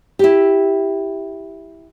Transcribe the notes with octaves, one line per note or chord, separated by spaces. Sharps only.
E4 G4